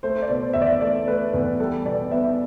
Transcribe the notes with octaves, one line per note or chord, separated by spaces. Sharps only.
A3 C5
D5
B2
C5
E2 E5
D5
A3 D5
A3 B4
E2 B4
G3 A4
B2 D5
B3 E5